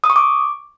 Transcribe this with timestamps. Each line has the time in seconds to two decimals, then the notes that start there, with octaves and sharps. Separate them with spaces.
0.04 D#6
0.10 C#6
0.16 D6